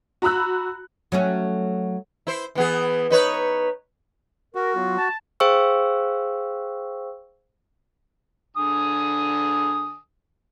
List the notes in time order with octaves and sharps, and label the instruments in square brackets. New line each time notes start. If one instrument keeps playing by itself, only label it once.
[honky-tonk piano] F#4 A#5 B5 E6 F#6
[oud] F#3 A3 C#4
[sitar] E4 C5
E3 B3 G#4
D#4 B4 C#5
[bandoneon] F#4 [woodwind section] A#4
[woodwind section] F#3 B3 F4
A5
[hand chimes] G#4 C5 F5 G5 C#6 E6
[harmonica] D3 G#5 D#6